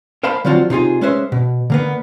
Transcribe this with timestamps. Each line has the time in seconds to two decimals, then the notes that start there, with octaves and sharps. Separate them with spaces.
0.23 A#4 C5 F5 A5 B5
0.45 D3 F3 F#3 C4 F4 F#4
0.70 C3 D#4 F4 G#4
1.01 G#3 C#4 B4 C5 E5
1.32 B2
1.70 D3 A#3 B3